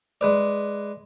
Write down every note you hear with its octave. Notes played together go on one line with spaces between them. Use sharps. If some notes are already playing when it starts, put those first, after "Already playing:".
G#3 B4 D5